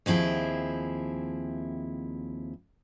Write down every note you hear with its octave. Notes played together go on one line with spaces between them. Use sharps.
D#2 F3 C4 E4 G#4